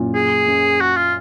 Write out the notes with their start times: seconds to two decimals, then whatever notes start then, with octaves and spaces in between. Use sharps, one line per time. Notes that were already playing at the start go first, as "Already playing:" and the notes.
Already playing: F#2 A#2
0.15 G#4
0.48 F#2
0.81 F#4
0.97 F4